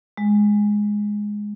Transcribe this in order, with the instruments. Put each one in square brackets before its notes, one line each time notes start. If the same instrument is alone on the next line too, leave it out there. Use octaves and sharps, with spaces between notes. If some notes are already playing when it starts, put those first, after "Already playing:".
[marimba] G#3